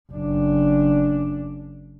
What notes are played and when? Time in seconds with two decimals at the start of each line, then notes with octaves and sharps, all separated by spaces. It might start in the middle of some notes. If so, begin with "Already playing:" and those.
0.12 F#1 D4